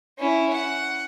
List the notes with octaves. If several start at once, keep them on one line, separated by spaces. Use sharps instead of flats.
C#4 E4
F#5